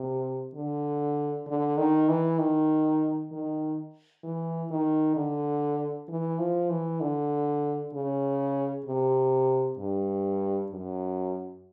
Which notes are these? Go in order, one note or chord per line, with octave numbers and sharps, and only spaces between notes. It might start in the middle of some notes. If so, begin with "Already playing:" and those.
Already playing: C3
D3
D3
D#3
E3
D#3
D#3
E3
D#3
D3
E3
F3
E3
D3
C#3
C3
G2
F#2